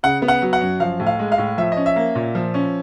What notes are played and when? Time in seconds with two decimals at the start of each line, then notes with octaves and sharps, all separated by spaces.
0.03 C#3 F#5
0.22 B3
0.28 F#5
0.42 F#3
0.53 F#5
0.61 F#2
0.80 F3 F5
1.00 A2
1.06 F5
1.19 G#3
1.32 F5
1.38 A2
1.58 F3 E5
1.72 C#4 D#5
1.86 E5
1.96 A#3
2.15 A#2
2.35 F3
2.54 C#4